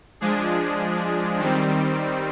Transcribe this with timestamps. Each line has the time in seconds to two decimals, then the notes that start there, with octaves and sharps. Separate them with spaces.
0.21 F3 G#3 D4 G#4
1.39 D#3 G3 C4